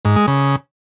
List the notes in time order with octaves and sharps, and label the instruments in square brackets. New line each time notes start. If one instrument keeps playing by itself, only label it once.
[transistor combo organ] G#2
G#3
C#3